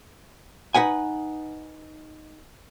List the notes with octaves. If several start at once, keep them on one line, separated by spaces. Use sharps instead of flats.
D#4 B4 F#5 G#5